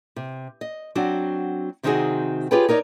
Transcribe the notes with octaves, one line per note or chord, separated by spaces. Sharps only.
C3
D#5
F#3 C4 D4 F#4
C3 D#3 C4 D#4 F#4 G#4
F4 G4 G#4 B4 C#5 G5
D#4 A#4 C#5 D5